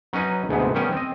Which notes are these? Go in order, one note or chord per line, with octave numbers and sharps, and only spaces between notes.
F#3 C#4 D#4 B4
D2 G#2 C3 G#3 B3
D#3 G3 B3 C#4 G5
C4 D#5